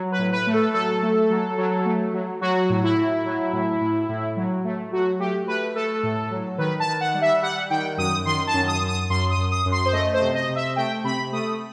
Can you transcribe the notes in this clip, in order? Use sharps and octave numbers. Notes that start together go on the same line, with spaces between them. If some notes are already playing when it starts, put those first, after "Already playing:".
Already playing: F#3
B4
A2
B4
A3
A4
F#3 A4
A3
F#3
F#3
A3
F#3
F#3 F#4
A2
E4
A2
F#3
A2
A2
A2
F#3
A3
F#3 F#4
A3 G4
A3 B4
A3 A4
A2
F#3
D#3 B4
A5
D#3
F#5
G3
E5
G3 F#5
D#3 G5
F#2 D#6
D#3 C6
A5
F#2
D#6
F#2
D#6
F#2 C6
D#6
F#2
D#6
F#2
C6
C5
A3 D#5
C5
C3
D#5
C3
E5
A3 G5
C3 B5
A3 D#6